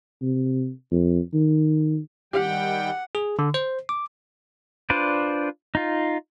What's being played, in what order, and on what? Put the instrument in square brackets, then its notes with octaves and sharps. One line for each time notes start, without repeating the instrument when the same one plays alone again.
[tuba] C3
F2
D#3
[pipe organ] D#3 G3 G5 [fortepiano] G4 [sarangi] F#5
[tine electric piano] G#4
D3
C5
D6
[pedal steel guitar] D4 F4 B4 C5 D5
D#4 F4